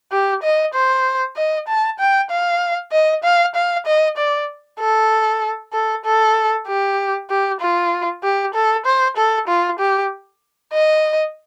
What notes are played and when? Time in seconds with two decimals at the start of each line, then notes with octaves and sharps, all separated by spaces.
0.12 G4
0.43 D#5
0.74 C5
1.36 D#5
1.68 A5
1.99 G5
2.30 F5
2.92 D#5
3.24 F5
3.55 F5
3.86 D#5
4.17 D5
4.80 A4
5.73 A4
6.05 A4
6.67 G4
7.30 G4
7.60 F4
8.23 G4
8.54 A4
8.86 C5
9.17 A4
9.48 F4
9.79 G4
10.73 D#5